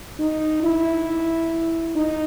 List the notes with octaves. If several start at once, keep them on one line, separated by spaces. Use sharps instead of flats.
D#4
E4
D#4